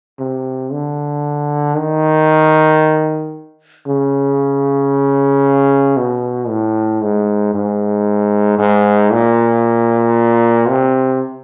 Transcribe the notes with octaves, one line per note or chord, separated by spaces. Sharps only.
C3
D3
D#3
C#3
B2
A2
G#2
G#2
G#2
A#2
C3